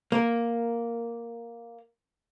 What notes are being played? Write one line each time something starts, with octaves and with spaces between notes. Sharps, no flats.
A#3 A#4